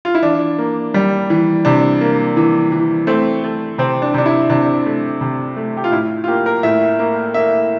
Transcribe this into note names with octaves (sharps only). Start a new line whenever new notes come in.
F4
E4
E3 D4
A#3
G3
E3
C3 D4
A#3
E3
E3
A3 C4
A3
C3 C4
D4
C3 D4
E4
C3 D4
A3
C3
A3
G4
F4
A2 E4
F4
A#3 G4
A#4
A2 E5
A#3
A#3 E5